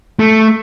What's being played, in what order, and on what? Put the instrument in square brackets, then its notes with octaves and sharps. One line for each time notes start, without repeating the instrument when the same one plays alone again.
[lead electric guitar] A3